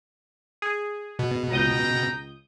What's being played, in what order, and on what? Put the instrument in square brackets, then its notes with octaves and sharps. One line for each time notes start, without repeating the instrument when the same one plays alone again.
[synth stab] G#4
[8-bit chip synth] B2
[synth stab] C#2 D#6 G6 [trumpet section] G5 A#5